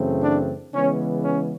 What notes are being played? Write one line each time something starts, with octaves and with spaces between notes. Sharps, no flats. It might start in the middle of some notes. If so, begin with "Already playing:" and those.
Already playing: F#2 C#3 E3 A3 C4
D4
C#3 E3 G#3 B3 C#4
C#4